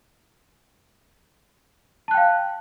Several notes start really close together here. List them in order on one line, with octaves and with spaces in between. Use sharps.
A5 F#6 G5 F5